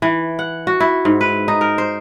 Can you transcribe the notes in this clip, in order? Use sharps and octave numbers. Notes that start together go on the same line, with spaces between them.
E3
F#5
F#4
E4
G#2
B4
D#4
A#4
C5